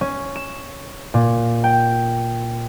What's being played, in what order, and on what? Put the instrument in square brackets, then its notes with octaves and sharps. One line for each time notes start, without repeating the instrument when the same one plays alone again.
[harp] C#4
E7
A#2
G5